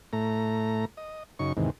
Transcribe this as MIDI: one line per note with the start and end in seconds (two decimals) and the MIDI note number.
0.13 0.85 45
0.13 0.85 57
0.13 0.85 82
0.97 1.23 75
1.39 1.53 42
1.39 1.53 49
1.39 1.53 63
1.39 1.53 85
1.57 1.70 40
1.57 1.70 44
1.57 1.70 48
1.57 1.70 51